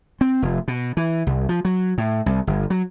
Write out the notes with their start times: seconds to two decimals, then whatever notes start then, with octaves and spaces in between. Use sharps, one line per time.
0.21 C4
0.42 F1
0.68 B2
0.97 E3
1.27 C2
1.49 F3
1.65 F#3
1.98 A2
2.26 C2
2.47 G1
2.70 F#3